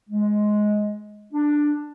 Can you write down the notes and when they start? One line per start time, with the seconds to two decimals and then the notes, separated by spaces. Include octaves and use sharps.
0.10 G#3
1.32 D4